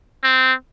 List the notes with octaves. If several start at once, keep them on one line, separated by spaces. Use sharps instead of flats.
C4